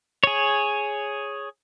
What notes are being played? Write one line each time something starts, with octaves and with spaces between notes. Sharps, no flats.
G#4 C#5